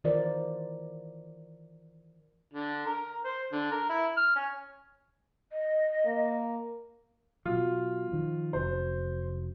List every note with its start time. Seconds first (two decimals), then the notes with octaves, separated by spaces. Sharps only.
0.04 D#3 E3 F4 A#4 C5 D5
2.53 D3
2.86 A#4
3.24 C5
3.52 D3
3.71 A#4
3.89 E4
4.17 F6
4.36 C#4
5.52 D#5
6.05 A#3
7.45 B2 F#3 F4
8.12 D#3 F3
8.53 F1 F#2 F#3 C5